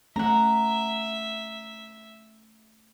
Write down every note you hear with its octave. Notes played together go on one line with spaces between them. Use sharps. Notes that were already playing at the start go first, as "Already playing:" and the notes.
A3 C#4 E5 F#5 A#5